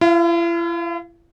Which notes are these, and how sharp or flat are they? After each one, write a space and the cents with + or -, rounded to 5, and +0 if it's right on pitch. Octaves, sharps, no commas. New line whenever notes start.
E4 +45 F5 +0